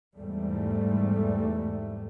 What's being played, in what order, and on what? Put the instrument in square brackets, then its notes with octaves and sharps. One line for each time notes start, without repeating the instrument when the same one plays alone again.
[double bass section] E2 G#2 G3 A3